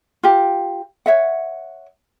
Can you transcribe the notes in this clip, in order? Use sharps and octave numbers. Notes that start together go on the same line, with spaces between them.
F4 G4
C#5 E5 F#5